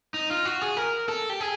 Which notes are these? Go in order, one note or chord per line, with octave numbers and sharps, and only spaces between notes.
D#4
F4
F#4
G#4
A#4
A4
G4
G#4